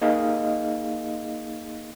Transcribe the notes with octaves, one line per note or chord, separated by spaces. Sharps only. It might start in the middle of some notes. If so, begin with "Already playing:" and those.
A#3 D#4 G#4 D#5 F5